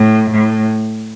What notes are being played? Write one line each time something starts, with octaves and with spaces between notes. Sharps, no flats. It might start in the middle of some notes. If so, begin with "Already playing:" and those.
Already playing: A2
A2